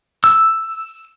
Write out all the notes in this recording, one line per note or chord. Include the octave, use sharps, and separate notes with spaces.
E6